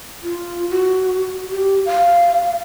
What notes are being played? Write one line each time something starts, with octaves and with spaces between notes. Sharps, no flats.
F4
F#4
G4
F5